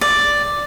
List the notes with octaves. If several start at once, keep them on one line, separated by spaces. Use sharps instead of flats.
D5